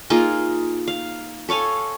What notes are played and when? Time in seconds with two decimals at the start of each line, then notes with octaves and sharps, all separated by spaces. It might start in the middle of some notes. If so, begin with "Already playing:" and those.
0.10 A#3 D#4 F4 G#4
0.88 F5
1.49 A4 C#5 F5 G#5